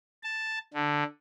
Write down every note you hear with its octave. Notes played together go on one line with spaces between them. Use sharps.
A5
D3